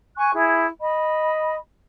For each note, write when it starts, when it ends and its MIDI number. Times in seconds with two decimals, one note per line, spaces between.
0.16 0.31 80
0.16 0.31 85
0.16 0.31 90
0.32 0.65 64
0.32 0.65 68
0.80 1.54 75
0.80 1.54 83